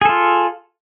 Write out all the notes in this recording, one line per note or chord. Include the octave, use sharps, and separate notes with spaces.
F4 G#4 A4